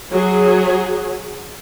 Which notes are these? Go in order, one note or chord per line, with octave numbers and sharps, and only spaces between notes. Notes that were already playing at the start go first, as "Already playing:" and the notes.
F#3 G#4